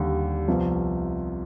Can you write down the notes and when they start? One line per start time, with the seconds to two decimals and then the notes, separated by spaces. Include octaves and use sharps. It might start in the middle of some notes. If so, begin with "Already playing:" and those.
Already playing: D#2 D3 G3
0.48 C2 C3 F3 B3